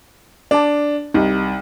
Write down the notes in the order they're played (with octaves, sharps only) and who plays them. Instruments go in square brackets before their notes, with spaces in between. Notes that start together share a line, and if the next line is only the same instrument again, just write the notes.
[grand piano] D4 [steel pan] D5 A5
[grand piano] C2 [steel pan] D#4